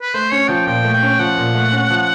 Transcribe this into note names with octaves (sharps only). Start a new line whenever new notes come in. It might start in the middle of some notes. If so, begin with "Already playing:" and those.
B4
A3 C5
C#4 C#5
F3 G5
A#2 G5
A3
G5
C#4
F3 F#5
A#2
A3
C#4
F3